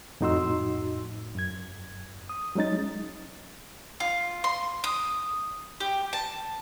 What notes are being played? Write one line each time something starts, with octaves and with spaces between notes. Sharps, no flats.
F2 A2 D#4 F#4 C6 E6
F#2 G#6
D#6
F#3 G#3 C#4 D#4 A6
F4
C6
D#6
G4
A5